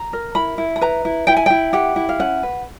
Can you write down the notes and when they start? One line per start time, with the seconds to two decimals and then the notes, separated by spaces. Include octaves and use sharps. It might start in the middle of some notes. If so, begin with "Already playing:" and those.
Already playing: A#5
0.13 A#4
0.35 E4 B5
0.58 E4
0.76 B5
0.81 B4 A#5
1.05 E4
1.27 E4 G5
1.37 G#5
1.46 E4 G5
1.73 G4 F#5
1.96 E4
2.09 F5
2.19 C#4 F#5
2.43 B4